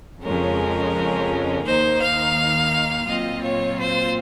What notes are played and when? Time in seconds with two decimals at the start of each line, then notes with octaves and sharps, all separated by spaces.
0.22 F2 C#3 G#3 C#4 A#4
1.65 D#2 D#3 A#3 D#4 C5
2.00 F5
3.07 A#2 F#3 C4 F4 D#5
3.42 C#5
3.79 C5